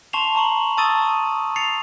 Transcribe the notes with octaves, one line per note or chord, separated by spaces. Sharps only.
A5 C6 C#6 C7 E7 F7
A5 A#5 C#6 F#7
A5 C#6 D#6 E6 A6 D#7
A6 C7 C#7 F7